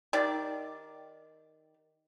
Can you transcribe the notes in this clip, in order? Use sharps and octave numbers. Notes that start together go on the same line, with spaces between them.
D#3 G4 D5